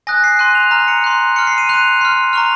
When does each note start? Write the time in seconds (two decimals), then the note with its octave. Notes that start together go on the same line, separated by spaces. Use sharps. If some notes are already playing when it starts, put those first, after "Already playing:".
0.07 G#5 D#6 F#6 A#6
0.24 C7
0.39 C6 F#6 D#7
0.55 F7
0.71 A#5 F6
0.88 C#7
1.04 C6 F#6
1.36 C6 F6 C#7
1.47 C7
1.58 D#7
1.69 C6 F#6 F7
2.01 C6 F6
2.33 A#5 C#6 F6 F7